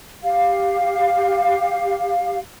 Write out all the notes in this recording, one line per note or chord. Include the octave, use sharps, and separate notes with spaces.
G4 F5